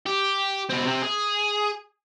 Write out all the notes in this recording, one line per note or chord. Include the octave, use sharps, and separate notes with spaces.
G4
B2 C4
C3 C4
G#4